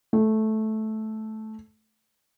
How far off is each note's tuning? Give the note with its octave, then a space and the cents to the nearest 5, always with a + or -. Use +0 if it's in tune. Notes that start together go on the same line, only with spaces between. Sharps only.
A3 -10